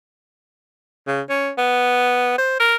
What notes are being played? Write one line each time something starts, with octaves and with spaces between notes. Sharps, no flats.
C#3
C#4
B3
C5
A#4